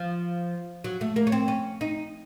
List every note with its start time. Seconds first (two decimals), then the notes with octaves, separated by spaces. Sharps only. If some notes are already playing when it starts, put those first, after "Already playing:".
Already playing: F3
0.84 F#3
1.01 A3
1.16 A#3
1.27 C#4
1.32 C4
1.48 C#4
1.81 D#4